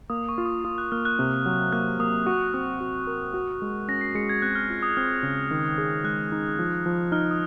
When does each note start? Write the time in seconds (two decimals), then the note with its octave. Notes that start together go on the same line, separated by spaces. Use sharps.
0.10 A#3 D#6
0.29 C#6
0.38 F4
0.46 D#6
0.65 F4 D#6
0.78 F#6
0.92 A#3 F6
1.05 F#6
1.19 C3
1.46 F#3
1.73 A#3 F#6
1.99 A#3 D#6
2.26 F#4 C#6
2.54 C4 D#6
2.80 F#4
3.07 A#4
3.34 F#4
3.62 G#3
3.88 C#4 A#6
4.01 C7
4.15 G#3 C#7
4.29 G#6
4.42 C4 F#6
4.55 F6
4.70 F4
4.82 D#6
4.97 C4 F6
5.23 C#3
5.51 D#3
5.78 G#4
6.04 G#3 F#6
6.32 D#4
6.59 F3
6.86 F3
7.12 D#4 F6
7.31 D#6